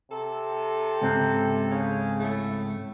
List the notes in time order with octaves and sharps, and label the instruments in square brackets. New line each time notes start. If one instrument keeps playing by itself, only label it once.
[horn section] C3 A4
[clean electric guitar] C#2 G#2 C4
[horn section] C#3
A2 A3